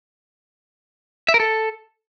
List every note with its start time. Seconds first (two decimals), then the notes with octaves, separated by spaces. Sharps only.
1.29 E5
1.34 A#4
1.40 A4